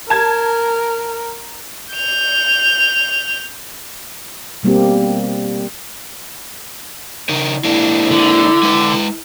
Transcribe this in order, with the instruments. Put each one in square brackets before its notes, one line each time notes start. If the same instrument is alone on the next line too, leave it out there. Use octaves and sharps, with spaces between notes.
[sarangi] A#4 [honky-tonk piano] A5 G#6
[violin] G6 F7
[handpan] B2 G3 A#3 C4 G4
[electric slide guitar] C#3 D#4 A#4
[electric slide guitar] G#3 A#3 D4 [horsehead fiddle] E4
[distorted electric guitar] D3
[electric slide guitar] G#3 B4